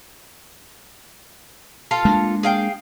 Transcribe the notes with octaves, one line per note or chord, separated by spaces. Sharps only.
F4 A4 F5
G#3 A#3 D4
G#4 F5 G5